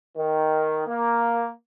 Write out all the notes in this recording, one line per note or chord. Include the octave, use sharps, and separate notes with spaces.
D#3
A#3